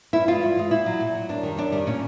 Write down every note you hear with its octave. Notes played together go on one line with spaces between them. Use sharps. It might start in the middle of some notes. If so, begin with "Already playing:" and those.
G2 E4
E3 G#3 F4
G2
E3 G#3
A#2 E4
F#3
A#2
F#3
F#2 D4
D#3 G3
F#2 D4
D#3 G3
A#2 C#4